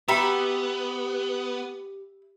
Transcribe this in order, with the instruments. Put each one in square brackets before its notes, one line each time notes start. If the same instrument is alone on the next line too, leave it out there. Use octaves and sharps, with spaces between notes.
[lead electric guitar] B3 [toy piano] F#4 G5 A#5 [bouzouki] G4 [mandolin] E5 B5